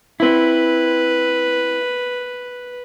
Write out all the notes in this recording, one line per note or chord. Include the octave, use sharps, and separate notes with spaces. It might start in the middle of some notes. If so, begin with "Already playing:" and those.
C4 E4 B4